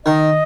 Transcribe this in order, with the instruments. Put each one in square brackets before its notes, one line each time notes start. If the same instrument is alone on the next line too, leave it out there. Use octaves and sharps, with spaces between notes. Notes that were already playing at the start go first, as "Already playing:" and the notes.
[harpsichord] D#3 [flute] D#5